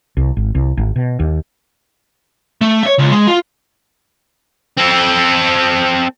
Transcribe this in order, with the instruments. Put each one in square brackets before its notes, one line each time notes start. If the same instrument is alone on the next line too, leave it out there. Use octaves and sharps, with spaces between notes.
[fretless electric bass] C2
G#1
C2
G#1
B2
D#2
[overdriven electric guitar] A3
C#5 E5
C#2
G#3
F4
[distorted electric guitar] C4 A4